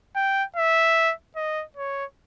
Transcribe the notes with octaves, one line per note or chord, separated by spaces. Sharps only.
G5
E5
D#5
C#5